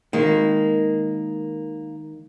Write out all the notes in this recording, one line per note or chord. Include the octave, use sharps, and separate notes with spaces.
D#3 G#3 A#3